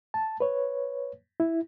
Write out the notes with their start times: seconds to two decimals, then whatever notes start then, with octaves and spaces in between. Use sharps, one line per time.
0.14 A5
0.40 B4 C#5
1.40 E4